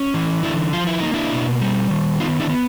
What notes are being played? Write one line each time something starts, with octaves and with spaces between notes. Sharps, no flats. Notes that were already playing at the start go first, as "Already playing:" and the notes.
Already playing: C#4
E3
D3 D4 E4
F3 F4
E4
A#3 D#4
D4 E4
B2
G3
D#3
B3 D#4 F4
D4 E4
B3